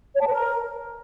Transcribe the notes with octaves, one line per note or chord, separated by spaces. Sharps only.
C#5
A5
B4
A#4